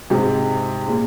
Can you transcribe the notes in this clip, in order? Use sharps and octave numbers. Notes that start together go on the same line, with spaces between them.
G#2 C3
A#2 C#3